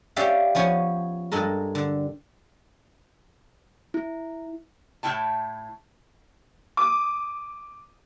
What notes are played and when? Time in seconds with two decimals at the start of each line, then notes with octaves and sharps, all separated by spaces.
0.16 C#4 G4 D5 E5 F5
0.55 F3 B3 C#4 C#5
1.32 G2 G#3 A4 A#4
1.75 D3
3.94 E4
5.03 A2 C#4 E4 G5 A5
6.77 D6 D#6